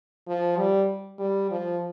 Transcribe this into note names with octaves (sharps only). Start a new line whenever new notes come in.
F3
G3
G3
F3